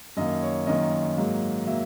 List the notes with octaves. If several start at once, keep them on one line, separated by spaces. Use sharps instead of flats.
F#2 D#3 A#3 D#5
C#5
F#2 D#3 A#3 D#5
G#2 F#3 A#3
F#3 A#3 E5